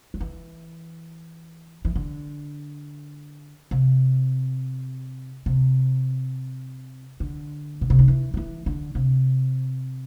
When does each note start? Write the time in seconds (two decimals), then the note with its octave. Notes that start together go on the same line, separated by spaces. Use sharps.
0.14 F#3
0.20 E3
1.85 E3
1.96 D3
3.71 C3
5.46 C3
7.20 D3
7.81 B2
7.90 C3
7.99 D3
8.08 E3
8.34 F#3
8.37 E3
8.66 D3
8.95 C3